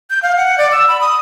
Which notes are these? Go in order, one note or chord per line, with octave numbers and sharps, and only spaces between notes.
G6
F5
F#5
D5
E6
B5
D#6